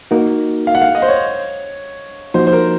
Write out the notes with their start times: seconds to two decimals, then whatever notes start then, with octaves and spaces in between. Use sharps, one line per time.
0.11 A#3 D#4 F#4 A#4
0.67 F5
0.75 F#5
0.82 F5
0.95 D#5
1.02 C5
1.08 C#5
2.34 F3 A#3 D#4 F#4 C5
2.47 C5
2.53 A#4